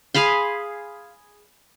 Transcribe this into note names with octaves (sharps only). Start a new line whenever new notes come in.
G#4 F5 B5 C6